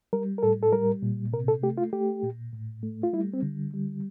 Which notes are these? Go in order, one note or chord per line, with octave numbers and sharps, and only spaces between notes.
G3 A#4
A#4
A2 A4
A4
G3 A#4
A#2
C3 A#4
A4
A3 G4
F4
A3 G4
A#2
A2
A3
F4
G3 E4
C4
D3
G3